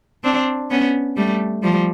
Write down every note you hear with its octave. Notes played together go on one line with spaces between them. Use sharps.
C4 D4
B3 C#4
G3 A3
F3 G3